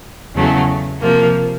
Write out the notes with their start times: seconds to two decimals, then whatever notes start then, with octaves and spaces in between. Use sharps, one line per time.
0.36 E2 C#3 F#3 A3 C#4
1.01 C3 F3 A#3